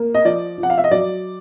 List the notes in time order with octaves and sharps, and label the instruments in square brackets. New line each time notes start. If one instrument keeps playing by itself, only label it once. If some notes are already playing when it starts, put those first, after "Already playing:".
Already playing: [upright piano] A#3
D#5
F3 D5
F3
F#5
F5
E5
D#5
F#3 D5